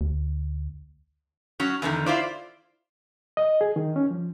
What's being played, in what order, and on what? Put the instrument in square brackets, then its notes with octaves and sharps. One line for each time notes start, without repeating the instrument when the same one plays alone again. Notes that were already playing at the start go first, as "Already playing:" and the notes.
[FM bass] D2
[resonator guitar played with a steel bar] F#3 C#4 C#5
E2 A2 D3 D#3
E4 F4 C5 D5
[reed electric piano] D#5
G#4
D#3
C#4
F3